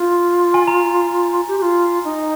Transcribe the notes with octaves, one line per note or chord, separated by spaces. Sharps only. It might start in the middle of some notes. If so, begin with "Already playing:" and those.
Already playing: F4 C6
G#5
A#5
G4
G4
F4
D#4